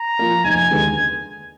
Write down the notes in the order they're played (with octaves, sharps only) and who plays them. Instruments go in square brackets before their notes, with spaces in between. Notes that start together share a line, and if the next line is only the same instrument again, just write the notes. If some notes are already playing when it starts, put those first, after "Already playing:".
Already playing: [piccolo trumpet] A#5
[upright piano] F3 A#3
[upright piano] F1 [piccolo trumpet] G#5
[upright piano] D#2 D3 G#3 B3